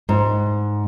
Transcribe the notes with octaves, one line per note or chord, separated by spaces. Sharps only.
G#2